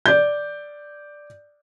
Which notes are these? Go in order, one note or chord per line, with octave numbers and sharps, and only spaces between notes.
D5 G6